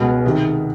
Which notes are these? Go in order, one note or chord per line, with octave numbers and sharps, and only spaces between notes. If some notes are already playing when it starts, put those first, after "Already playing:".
Already playing: C#2 B2
C3 D#3